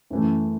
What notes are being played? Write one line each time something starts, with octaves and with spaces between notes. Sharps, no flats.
F#2 E3 A3